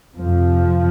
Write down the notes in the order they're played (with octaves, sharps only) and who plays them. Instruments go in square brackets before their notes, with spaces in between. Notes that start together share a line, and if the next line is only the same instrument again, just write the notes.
[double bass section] F2 C3 F3